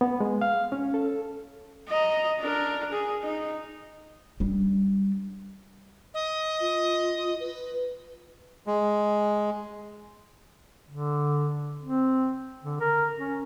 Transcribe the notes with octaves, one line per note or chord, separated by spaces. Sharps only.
B3
G#3
F5
C#4
A4
D#5 A#5
D4 A#4
G#4
D#4
G3 D4
D#5
F4
B4
G#3
D3
C4
D3
A#4
C#4